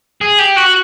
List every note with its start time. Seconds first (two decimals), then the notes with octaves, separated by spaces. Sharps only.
0.21 G#4
0.39 G4
0.57 F#4